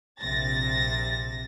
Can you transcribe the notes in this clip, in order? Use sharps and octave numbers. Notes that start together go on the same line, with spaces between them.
A#1 C3 A6 A#6